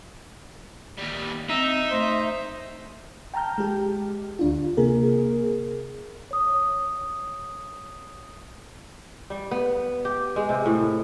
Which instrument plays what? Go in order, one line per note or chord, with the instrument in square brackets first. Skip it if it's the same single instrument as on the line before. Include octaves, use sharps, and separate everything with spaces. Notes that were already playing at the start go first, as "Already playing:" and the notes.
[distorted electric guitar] D#2 G3
[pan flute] C4 [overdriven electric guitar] D#4 [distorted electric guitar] E5
[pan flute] A3 [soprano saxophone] C5
[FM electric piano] G5 A5 A#5 F6 G6
G#3 G4
D2 D4 F4
C3 A#3 G#4 A#4
[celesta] C#5 D#6
[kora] G3
B3
G4
G#3
C3
A2